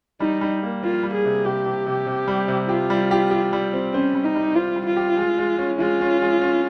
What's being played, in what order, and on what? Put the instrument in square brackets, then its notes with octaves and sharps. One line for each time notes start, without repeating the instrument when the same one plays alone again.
[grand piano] G3 [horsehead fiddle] D#4
[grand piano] G3
A#3
[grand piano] A#3 [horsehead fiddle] F4
[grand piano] G3
[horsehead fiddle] G#4
[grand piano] C3
[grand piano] C3 [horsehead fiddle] G4
[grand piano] C3
C3
C3
G3
C3
[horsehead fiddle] F4 [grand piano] G4
[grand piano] G3
G4
G4
G3
C4
[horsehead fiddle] C#4 [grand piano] C5
[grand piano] G3
[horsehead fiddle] D#4
[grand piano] G3
[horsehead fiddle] F4 [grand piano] C5
[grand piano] G3
[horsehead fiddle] F4
[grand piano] G4
G#3
G#3
C#4
[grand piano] G#3 [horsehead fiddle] F4
[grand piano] C#4
G#3
C#4